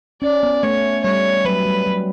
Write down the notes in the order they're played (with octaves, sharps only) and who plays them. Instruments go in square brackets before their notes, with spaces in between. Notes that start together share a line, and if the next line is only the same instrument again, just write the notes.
[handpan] C#4 [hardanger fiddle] D5
[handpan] B3
[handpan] A3 [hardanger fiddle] C#5
[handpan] G3 [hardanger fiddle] C#5
[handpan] F#3 [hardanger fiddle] B4
[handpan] G3
F#3